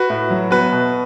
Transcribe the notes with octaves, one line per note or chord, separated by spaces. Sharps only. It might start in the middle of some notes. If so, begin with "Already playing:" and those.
Already playing: F#4 B4
A2
F#3
B3 F#4 B4
B2